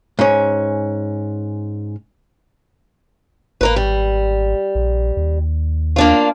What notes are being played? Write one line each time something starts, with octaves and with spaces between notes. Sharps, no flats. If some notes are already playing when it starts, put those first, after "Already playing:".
G#2 C#4
G#1 A#3 A#4 B4
G3
A#1
D#2
A#3 D4 F4